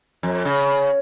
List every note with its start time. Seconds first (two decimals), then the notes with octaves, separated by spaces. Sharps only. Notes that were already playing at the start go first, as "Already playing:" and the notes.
0.23 F2
0.45 C#3